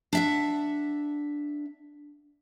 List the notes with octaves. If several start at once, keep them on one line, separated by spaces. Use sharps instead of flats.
D4 E5 F#5